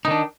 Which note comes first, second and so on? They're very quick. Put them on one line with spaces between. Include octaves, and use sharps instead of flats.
D#4 D#3 D4